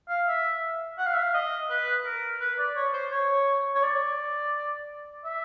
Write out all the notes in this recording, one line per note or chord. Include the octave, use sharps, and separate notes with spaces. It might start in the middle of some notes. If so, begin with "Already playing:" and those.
F5
E5
F#5
F5
E5
F5
D#5
B4
A#4
B4
D5
C#5
C5
C#5
C#5
D5
E5